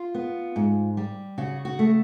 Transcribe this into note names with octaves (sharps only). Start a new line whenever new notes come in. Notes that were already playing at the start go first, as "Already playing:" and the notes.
Already playing: F4
B3
G#2
G3
C#3 F#4
F#4
A3